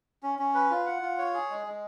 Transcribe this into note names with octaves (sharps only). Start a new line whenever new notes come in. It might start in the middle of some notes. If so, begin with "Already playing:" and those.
C#4
C#4
B4
F4
F#5
F4
C#5
G#4
G#3
G#3